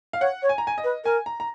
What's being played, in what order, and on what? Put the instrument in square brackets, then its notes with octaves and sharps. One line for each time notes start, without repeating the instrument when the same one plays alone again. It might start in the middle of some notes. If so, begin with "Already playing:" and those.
[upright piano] F5
[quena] C#5 [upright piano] F#5
[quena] C#5
[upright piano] G#5
A#5
G#5
D#5
[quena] B4
[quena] A#4 [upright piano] G#5
[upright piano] A#5
A#5